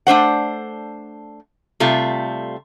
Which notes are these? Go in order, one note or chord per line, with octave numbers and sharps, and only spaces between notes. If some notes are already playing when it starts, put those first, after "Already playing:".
A3 D4 C5 F#5
C3 G3 A3 F4